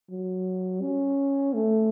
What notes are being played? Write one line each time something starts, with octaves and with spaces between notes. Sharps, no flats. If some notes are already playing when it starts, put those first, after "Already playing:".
F#3
C#4
A3